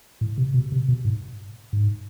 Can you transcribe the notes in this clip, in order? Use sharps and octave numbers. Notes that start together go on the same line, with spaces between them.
A2
C3
B2
C3
B2
G#2
G#2